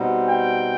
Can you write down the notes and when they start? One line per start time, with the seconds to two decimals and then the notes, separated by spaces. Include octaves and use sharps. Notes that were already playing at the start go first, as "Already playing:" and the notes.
Already playing: B2 G3 C4 D#4
0.28 G5